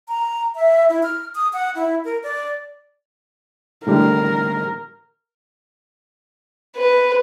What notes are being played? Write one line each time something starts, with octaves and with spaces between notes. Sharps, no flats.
A#5
E5
E4
F6
D#6
F#5
E4
A#4
D5
A2 D3 G3 A#4
B4